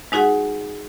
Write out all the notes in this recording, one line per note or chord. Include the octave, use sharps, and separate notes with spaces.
G#3 D#4 F#4 G#4 F#5